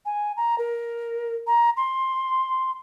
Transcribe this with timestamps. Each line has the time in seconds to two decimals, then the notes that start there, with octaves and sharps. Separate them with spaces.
0.06 G#5
0.37 A#5
0.58 A#4
1.47 A#5
1.77 C6